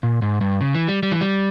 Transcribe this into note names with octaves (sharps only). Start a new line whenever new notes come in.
A#2
G#2
G2
C#3
E3
G3
G3
E3
G3